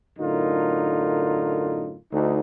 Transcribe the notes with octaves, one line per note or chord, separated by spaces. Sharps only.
F#2 A2 D3 D#4 F4 A#4
D2 D#4